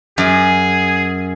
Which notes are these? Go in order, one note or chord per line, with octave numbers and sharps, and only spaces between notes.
F#2 G#4